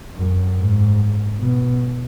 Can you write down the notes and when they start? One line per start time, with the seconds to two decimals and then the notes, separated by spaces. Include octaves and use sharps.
0.15 F#2
0.57 G#2
1.40 B2